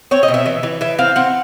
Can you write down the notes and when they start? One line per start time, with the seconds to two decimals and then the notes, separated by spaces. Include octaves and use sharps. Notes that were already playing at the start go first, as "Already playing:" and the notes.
0.11 C4 C#5
0.23 D#5
0.28 B2
0.34 E5
0.46 E3
0.63 E3
0.81 E3 E5
0.99 C4 F5
1.16 C4 F#5